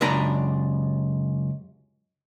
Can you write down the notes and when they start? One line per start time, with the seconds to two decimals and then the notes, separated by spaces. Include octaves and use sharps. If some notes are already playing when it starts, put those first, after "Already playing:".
0.01 C#2 F#2 D4 A#5 B5